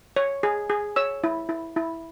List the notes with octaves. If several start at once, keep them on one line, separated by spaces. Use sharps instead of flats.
C#5
G#4
G#4
C#5 E6
E4
E4
E4